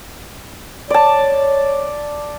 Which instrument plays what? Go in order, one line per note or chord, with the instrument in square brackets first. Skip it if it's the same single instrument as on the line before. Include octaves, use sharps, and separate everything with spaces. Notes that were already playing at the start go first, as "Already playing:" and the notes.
[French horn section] C#5 [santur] D5 A5